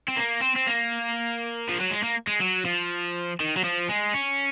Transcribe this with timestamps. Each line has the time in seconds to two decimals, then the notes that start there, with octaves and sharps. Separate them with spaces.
0.08 C4
0.17 A#3
0.42 C4
0.56 C4
0.67 A#3
1.69 F3
1.80 F#3
1.91 G#3
2.04 A#3
2.27 G#3
2.40 F#3
2.65 F3
3.40 D#3
3.57 F#3
3.64 F3
3.89 G#3
4.15 C#4